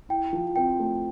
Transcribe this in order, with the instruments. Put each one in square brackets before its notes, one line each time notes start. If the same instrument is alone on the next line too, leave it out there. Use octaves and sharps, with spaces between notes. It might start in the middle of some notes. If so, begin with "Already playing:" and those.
[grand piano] E4 [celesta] G5
[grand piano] F3
[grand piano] C4 [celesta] G5
[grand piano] A3